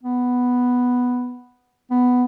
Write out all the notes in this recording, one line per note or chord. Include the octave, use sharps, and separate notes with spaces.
B3
B3